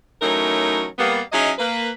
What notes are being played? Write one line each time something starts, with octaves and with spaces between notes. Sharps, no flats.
E3 F#3 A3 C#4 D#4 A#4
G3 A#3 B3
F#3 C#4 D#4 E4 G#4 D#5
A#3 B4